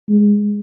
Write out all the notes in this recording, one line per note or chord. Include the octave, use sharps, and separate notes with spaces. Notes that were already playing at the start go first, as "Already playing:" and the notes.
G#3